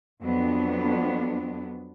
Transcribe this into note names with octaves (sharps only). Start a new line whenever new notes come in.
F2 F#3 B3 D4